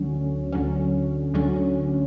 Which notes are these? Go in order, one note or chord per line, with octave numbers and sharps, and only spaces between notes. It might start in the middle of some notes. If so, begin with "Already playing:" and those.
Already playing: D2 D3 F#3 C#4
D2 D3 F#3 C#4
D2 D3 F#3 C#4